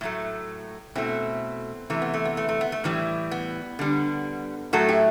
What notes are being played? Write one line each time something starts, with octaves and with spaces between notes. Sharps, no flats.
A2 F#3 A3
B2 A3 C4 E4
C3 E3 A3
B3
A3
B3
A3
A3
B3
A3
A2 E3 G3
B3
D3 G3
A2 F#3 A3 F#4 A4
E4 G4